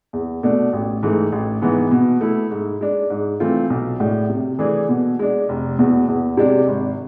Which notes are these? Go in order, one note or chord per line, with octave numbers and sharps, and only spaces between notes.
E2
B2 A3 D4
A1
G#2 E3 A3
A1
G#2 E3 B3
B2
A3 E4
G#2
G#3 D4
G#2
E3 A3 C4 F4
B1
A2 G#3 D4
C3
E3 A3 D4 G#4
B2
G#3 D4
F1
E2 B2
E2
C3 G#3 D4
G#1